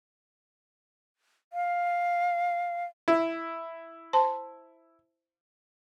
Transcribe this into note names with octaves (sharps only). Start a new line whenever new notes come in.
F5
E4
C5 A5 C6